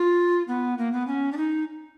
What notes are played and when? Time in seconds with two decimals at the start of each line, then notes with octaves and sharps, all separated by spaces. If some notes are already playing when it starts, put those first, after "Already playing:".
Already playing: F4
0.48 B3
0.78 A#3
0.93 B3
1.07 C#4
1.32 D4
1.37 D#4